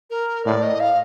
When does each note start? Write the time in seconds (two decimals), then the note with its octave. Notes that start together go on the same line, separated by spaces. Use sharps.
0.10 A#4
0.45 A2 D5
0.63 D#5
0.80 F5